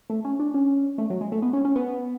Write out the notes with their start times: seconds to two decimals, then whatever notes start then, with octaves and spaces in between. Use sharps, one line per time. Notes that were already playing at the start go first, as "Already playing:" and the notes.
0.10 A3
0.25 C#4
0.40 D4
0.54 C#4
0.98 A3
1.10 F#3
1.21 G#3
1.32 A3
1.42 B3
1.53 C#4
1.65 C#4
1.76 B3